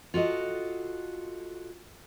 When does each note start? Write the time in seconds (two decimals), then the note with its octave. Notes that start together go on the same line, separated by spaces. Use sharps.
0.14 F4 F#4 A4 D#5